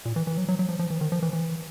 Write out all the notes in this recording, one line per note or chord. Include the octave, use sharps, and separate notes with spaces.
A#2
E3
E3
F#3
F#3
F#3
F3
F3
E3
D#3
F3
E3
E3